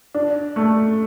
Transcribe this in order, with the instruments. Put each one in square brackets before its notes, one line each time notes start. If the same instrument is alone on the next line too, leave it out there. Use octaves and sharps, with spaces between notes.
[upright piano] D4
A3